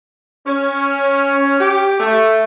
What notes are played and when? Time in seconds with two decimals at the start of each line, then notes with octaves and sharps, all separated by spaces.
0.47 C#4
1.60 G4
2.00 A3